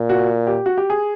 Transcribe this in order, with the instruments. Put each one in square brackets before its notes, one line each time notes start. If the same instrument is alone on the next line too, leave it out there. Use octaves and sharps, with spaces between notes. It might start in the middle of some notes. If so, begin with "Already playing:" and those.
Already playing: [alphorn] A#2
[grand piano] F#4
G4
F#4
G4
G#4